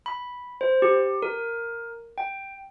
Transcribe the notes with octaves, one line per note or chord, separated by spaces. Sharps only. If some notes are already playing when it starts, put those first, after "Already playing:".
B5
C5
G4
A#4
G5